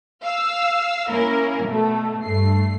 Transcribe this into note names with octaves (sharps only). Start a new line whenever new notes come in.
F5 E6
A#3 C#4 E4 A#4
B2 A3
G2 A3 C7